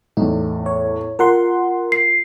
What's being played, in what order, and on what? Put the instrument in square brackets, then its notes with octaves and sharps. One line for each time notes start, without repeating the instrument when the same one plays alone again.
[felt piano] E2 A2 [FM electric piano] D#4
[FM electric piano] C#5
[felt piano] F4 [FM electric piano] A#4 F#5 C6
[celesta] C7